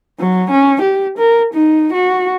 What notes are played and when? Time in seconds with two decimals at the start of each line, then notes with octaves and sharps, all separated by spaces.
0.19 F#3
0.51 C#4
0.81 G4
1.18 A#4
1.54 D#4
1.93 F#4